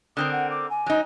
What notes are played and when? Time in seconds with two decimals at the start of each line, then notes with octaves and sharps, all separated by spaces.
0.17 D3 C4 A#4 D#6
0.32 F#5
0.51 D6
0.70 G#5
0.86 F#3 D#4